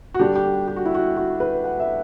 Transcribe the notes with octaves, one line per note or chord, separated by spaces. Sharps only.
F#4
D3 G3 D4 G4
G4
G4
F#4
E4
F#4
F#4
B4
F#5
E5